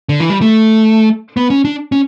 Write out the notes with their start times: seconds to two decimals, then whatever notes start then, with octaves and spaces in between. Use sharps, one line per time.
0.09 D3
0.20 E3
0.30 G3
0.41 A3
1.37 B3
1.50 C#4
1.65 D4
1.92 C#4